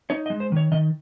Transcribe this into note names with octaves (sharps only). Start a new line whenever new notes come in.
D#4 C#5
D#5
G#3
C5
D#3 C#5
D#3 D#5